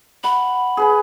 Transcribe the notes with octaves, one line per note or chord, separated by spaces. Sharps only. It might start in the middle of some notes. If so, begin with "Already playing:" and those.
F#5 B5
G#4 B4 G#5